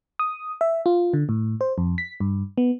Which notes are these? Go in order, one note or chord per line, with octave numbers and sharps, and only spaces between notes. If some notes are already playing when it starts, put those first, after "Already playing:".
D#6
E5
F4
D3
A2
C5
F2
B6
G2
B3